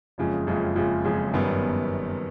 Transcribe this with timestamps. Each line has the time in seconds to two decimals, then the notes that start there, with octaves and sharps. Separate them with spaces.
0.18 F#1 F2 C#3 F3 G#3
0.47 F#1 F2 C#3 F3 G#3
0.76 F#1 F2 C#3 F3 G#3
1.05 F#1 F2 C#3 F3 G#3
1.34 G1 F#2 D#3 G3 B3